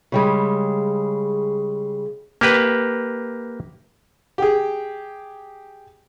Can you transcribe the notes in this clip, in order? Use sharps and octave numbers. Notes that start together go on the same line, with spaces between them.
C#3 G3 G#3
A#3 G4 B4
G4 G#4